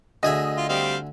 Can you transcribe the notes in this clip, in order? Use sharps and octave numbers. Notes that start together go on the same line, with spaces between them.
D2 G#4 D#5 E5
F4
G3 C4 F5